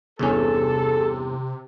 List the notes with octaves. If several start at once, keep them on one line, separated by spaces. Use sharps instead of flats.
E2 G2 C3 C#4 G#4 A4